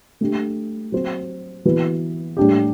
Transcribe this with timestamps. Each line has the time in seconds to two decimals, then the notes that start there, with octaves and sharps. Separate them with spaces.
0.21 A3 D4 G4
0.92 F#3 C4 F#4 C5
1.65 E3 B3 F#4 B4
2.37 A2 G3 D4 G4